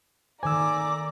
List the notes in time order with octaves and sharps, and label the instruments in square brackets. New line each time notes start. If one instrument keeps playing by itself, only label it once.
[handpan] D#3 A4 C5 [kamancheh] D5 A#5 [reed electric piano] G#5 E6 [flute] D6